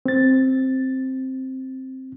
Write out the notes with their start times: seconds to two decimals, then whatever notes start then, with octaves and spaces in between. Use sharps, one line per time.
0.06 C4 A6